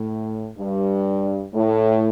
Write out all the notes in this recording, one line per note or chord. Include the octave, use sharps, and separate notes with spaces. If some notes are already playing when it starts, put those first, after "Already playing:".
Already playing: A2
G2
A2